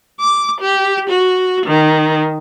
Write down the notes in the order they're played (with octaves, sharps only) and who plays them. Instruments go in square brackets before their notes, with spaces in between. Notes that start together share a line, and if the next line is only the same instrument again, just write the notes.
[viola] D6
G4
F#4
D#3